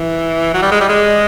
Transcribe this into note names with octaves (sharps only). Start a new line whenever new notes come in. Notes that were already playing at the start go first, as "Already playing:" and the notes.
Already playing: E3
F#3
G3
G#3
G3
G#3